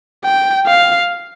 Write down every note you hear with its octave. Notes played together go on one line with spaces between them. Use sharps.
G5
F5